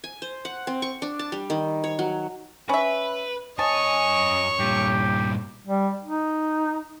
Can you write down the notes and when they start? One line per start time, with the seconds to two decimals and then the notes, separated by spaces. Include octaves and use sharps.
0.04 G#5
0.22 C5
0.45 F#5
0.67 C4
0.82 C#6
1.02 D4
1.19 A5
1.32 G3
1.50 D#3
1.84 C#5
1.99 F#3
2.69 C#4 B4 E5
3.59 F#2 C#5 D#5 G#5 A5 C#6
4.59 G2 A#2 G4
5.66 G3
6.03 D#4